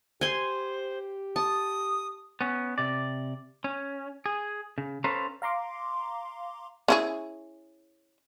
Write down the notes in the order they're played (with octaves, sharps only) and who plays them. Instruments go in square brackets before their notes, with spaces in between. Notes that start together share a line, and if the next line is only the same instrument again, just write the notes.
[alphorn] G4 [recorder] C5 [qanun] G#5 C6
[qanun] A5 [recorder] D#6
[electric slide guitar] B3 C#4
C3 D5
C#4
G#4
C#3
C#4 A4 B4 C5 F5 A#5
[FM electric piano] F5 A#5 C6 D6
[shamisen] C#4 E4 G#4